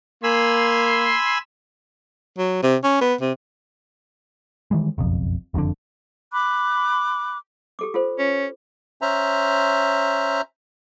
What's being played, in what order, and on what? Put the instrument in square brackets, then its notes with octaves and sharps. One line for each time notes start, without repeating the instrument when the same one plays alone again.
[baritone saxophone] A#3 [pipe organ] G#5 B5 E6 [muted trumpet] C6
[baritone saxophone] F#3
C3
C#4
B3
C3
[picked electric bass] D#3 E3 G3 G#3
F#1 B1 F2
F#1 F2 A2 D3
[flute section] B5 D6 F#6
[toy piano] G4 A4 D6
F4 A4 C5
[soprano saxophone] C#4
[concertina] C#4 C5 E5 A#5